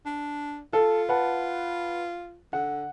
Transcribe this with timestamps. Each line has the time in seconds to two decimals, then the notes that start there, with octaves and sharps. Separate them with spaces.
0.05 D4
0.73 F4 A4
1.09 B4 F#5 A5
2.53 D3 F#5